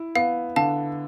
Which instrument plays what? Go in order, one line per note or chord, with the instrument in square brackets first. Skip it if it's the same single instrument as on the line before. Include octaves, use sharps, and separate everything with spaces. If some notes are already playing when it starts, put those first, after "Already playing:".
Already playing: [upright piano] E4
[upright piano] B3 [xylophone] F5
[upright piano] D3 [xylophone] F5 A5